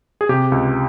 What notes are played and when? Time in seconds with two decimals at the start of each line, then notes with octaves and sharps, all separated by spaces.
0.21 G#4
0.29 C3 G4
0.52 C#2